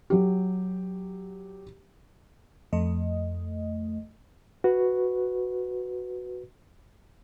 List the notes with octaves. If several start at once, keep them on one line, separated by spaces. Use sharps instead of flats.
F#3 G4
F2 A3 D#5
F#4 B4